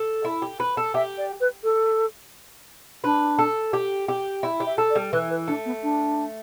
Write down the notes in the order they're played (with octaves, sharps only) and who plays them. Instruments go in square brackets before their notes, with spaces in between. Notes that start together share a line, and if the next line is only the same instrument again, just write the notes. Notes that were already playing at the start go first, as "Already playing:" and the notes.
Already playing: [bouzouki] A4
E4
G4
B4
A4
[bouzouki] G4 [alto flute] E5
[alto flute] D5
B4
A4
[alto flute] D4 [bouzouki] B4
[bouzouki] A4
G4
G4
E4
G4
[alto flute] E5
[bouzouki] A4
[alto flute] D5
[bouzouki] G3
[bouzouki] E3 [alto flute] B4
[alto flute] B4
[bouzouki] A3 [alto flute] D4
[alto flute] B3
D4